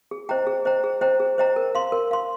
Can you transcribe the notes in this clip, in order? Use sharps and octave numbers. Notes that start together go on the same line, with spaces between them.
G#4
C5 D#5 G5 A#5
G#4
C5 D#5 G5 A#5
G#4
C5 D#5 G5 A#5
G#4
C5 D#5 G5 A#5
A#4
F5 C6
A#4
F5 C6